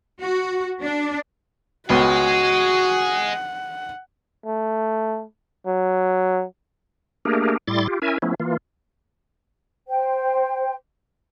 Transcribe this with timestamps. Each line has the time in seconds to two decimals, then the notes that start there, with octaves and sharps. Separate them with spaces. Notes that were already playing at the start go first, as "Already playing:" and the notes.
0.21 F#4
0.81 D4
1.89 C#2 B3 F#4 G#4 D#5 F#5
4.46 A3
5.67 F#3
7.25 A3 A#3 D4 G4 G#4 A#4
7.68 A2 G3 E4 C6 D6 A6
7.88 F4 G4
8.02 C#4 E4 A#4 E5 G#5
8.22 F3 A3 B3 C#4 E4
8.40 E3 A#3 F4
9.88 C5 G5